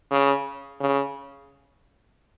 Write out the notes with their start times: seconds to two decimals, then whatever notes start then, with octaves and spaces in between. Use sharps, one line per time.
0.11 C#3
0.81 C#3